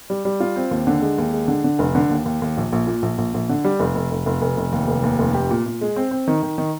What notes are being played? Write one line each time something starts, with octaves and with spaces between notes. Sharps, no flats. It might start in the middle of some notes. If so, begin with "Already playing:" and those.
G3
G3
F4
C4
D#2
D3
G#3
D#2
G#3
D3
D3
F1
D3
D#2
D#2
D#2
A#1
A#1
A#2
A#1
A#1
A#1
D3
G3
F1
F1
F1
F1
F1
F1
D#2
F1
D#2
F1
G4
A#2
A#2
G#3
C4
C4
D#3
D#3
D#3